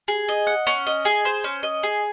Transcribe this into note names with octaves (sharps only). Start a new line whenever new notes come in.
G#4
D#5
F#5
C#4
D#5
G#4
C5
C#4
D#5
G#4